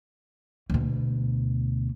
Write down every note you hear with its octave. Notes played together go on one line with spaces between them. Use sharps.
D2 B2